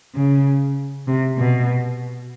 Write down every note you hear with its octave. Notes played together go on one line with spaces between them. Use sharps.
C#3
C3
B2